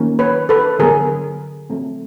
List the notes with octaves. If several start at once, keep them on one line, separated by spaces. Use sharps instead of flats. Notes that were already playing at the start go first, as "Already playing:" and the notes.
Already playing: D#3 F#3 A#3 C#4
B4 C#5
A4 B4
D3 F#3 B3 G#4 A#4
F#3 A3 C4